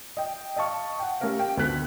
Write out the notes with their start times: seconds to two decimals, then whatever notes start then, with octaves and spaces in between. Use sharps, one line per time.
0.17 D#5 G5
0.56 D#5 F5 A5 C#6
0.99 F#5 G5
1.20 A3 C#4 G4 A#4 F5
1.39 G5
1.57 D2 B3 A4 F#6 B6